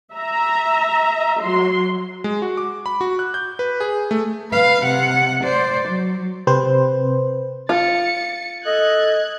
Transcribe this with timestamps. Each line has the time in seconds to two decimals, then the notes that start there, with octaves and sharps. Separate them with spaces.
0.14 E5 A#5
1.43 F#3 C6
2.24 G#3
2.42 F#4
2.57 D6
2.86 B5
3.01 F#4
3.19 F#6
3.34 G6
3.59 B4
3.80 G#4
4.11 A3
4.51 B4 F5
4.83 C3 F#5
5.44 C5 D5
5.89 F#3
6.47 C3 C4 B4 C5
7.69 F4 A6 C#7
8.64 A4 D#5 F#6 G#6